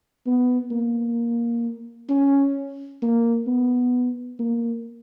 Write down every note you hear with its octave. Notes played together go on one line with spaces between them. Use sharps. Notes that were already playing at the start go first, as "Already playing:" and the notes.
B3
A#3
C#4
A#3
B3
A#3